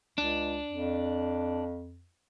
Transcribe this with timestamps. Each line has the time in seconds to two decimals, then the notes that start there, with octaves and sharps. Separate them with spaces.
0.18 C#2 D4
0.72 F2